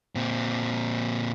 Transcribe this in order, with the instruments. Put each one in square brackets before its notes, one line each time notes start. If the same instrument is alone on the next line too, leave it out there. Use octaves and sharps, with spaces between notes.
[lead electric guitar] A#2 C4